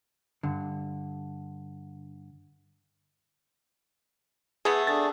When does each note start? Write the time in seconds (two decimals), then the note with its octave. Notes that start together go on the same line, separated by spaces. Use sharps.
0.43 G2 D3
4.65 A3 B3 G#4
4.87 D4 G#4 A4 A6